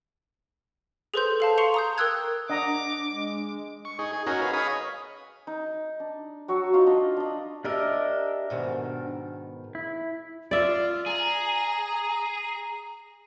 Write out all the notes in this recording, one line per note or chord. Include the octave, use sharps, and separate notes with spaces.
G#4 A4 B4 C5 C6 G6
A4 F5 A5
F5 C6 C#6 C#7 F7
A#5 D#6 G6
A#4 G5 D#6 E6 F#6 G#6
D4 D#5 F#5 A#5 D6
G#3
C#6
D#4 G#4
G#4
C#4 D#4 F#4 G#4 A#4
G#4 B4 F5
C#5 D#5 F5 G#5 B5 D#6
D#4
D4
F#3 F#4 C#6 E6
D#4 F4 F5
D4 D#5
D4 D#5
D4 G4 A#4 D#5 E5
G#2 B2 D#3
E4
F4 D5 E5
G#4 A#5